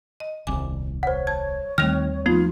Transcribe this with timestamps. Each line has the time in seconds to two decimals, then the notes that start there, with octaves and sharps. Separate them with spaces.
0.20 D#5
0.47 D#1 C2 G#5 D6
1.03 C5 C#5 F#5
1.27 A5 G#6
1.78 D#2 D#3 G3 A3 C4 F6 F7
2.26 F3 A3 B3 D#4 F4